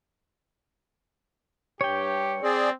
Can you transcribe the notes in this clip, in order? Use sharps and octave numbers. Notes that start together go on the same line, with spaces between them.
G2 G4 C#5 G5
C4 G#4 D5